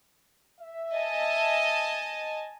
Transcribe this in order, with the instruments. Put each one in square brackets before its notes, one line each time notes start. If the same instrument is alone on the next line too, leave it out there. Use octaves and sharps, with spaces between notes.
[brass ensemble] E5
[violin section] D#5 G#5 A5